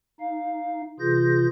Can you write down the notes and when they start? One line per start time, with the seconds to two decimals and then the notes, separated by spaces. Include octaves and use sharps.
0.20 D#4 F5
1.00 C3 E3 F4 G#4 G6 A#6